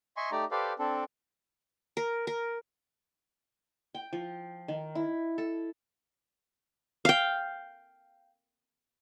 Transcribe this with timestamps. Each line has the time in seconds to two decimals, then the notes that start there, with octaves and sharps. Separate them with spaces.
0.17 D#5 E5 G#5 C6 C#6
0.32 A3 D#4 G4 D5 A#5
0.51 G4 A4 B4 C5 D5 F5
0.79 C4 D4 A4
1.97 A#4
2.27 A#4
3.95 G5
4.13 F3
4.68 D#3
4.95 E4
5.38 A4
7.05 F5 G5